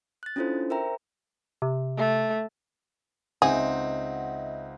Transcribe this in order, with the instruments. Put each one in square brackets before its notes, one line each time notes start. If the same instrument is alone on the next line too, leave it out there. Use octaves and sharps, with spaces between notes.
[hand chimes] F#6 A6
C#4 D4 E4 F4 A4 C5
A#4 C5 E5 G5 A#5
[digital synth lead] C3
[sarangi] A3
[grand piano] C#2 C4 D#4 [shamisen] G#4 [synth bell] D#5 E5 F#5